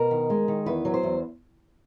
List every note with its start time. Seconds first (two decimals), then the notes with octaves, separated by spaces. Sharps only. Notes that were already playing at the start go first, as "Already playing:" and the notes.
Already playing: B2 A#4
0.11 D#3
0.30 G#3
0.48 D#3
0.66 E2 B4
0.85 F#3
0.94 C5
1.03 E2